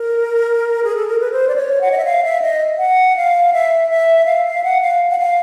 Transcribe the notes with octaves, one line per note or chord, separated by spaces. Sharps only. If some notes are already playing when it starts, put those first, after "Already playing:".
Already playing: A#4
G#4
A4
A#4
B4
C5
D5
C#5
F#5
D#5
E5
F5
E5
D#5
F#5
F5
E5
E5
F5
F5
F#5
F5
F#5
F5